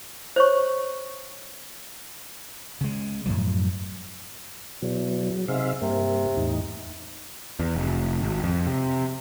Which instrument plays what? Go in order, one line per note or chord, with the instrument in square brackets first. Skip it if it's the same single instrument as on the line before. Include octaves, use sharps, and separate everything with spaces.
[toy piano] C5 C#5 C#6
[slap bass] C#3 G#3
F#2 A2 F3 F#3
[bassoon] E2 [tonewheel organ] B2 F#3
[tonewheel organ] F#3
[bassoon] G#2 [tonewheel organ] C3 E5 F5
[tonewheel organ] G2 A#3 [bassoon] C3
[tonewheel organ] E2 A2 D#4
[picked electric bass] E2
F1
G#1
F2
C3